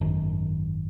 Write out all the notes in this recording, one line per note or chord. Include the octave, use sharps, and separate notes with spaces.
G#1 F#2 D#3